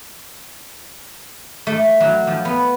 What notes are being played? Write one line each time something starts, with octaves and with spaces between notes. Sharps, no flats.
A3
F#3
F3
B3